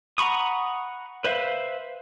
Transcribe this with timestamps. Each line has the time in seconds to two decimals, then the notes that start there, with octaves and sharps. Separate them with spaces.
0.18 F#5 A#5 B5 C#6 D#6
1.24 B4 C5 E5 F5